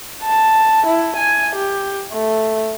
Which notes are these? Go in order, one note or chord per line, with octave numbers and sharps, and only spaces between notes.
A5
E4
G#5
G4
A3